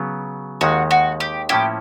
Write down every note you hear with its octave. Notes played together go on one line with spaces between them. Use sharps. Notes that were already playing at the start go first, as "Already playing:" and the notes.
Already playing: C#3 F#3 B3
D#2 D#3 G#3 F#4
F#4
G4
A2 F3 A#3 C#4 E4 G4